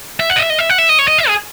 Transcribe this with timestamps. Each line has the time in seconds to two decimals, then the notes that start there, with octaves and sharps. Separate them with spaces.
0.20 E5
0.30 F#5
0.36 D#5
0.39 E5
0.50 D#5
0.59 E5
0.70 F#5
0.78 E5
0.89 D#5
0.99 C#5
1.08 D#5
1.18 E5
1.28 G#4